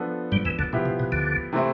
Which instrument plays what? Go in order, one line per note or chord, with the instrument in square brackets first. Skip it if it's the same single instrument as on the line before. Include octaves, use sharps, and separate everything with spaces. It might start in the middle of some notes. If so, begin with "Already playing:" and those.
Already playing: [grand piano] F3 B3 D4 A4
[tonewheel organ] G2 G3
E2 E3
D2 D3
[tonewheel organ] B2 [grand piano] F3 B3 E4 G4
[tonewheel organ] C3
B2
D2 D3
[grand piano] C3 E3 A3 C4 E4